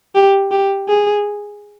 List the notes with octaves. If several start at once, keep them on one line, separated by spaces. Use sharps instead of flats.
G4
G4
G#4